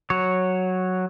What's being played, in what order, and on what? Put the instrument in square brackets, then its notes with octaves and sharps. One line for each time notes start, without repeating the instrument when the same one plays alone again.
[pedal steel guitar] F#3 C#5